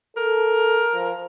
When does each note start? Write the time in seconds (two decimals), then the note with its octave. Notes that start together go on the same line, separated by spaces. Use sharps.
0.17 A4 A#4
0.93 F3